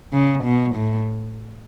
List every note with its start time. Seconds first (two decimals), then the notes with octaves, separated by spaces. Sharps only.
0.13 C#3
0.44 B2
0.75 A2